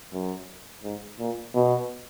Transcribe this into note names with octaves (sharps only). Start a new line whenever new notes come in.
F#2
G#2
A#2
B2